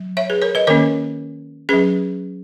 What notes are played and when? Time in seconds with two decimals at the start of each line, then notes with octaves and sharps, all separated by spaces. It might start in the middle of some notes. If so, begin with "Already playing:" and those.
Already playing: F#3
0.17 C#5 E5
0.30 G#4 B4
0.42 A#4 C#5
0.55 B4 D#5
0.67 D#3 A#3 C#4 A#4 C#5
1.69 F#3 C#4 G#4 B4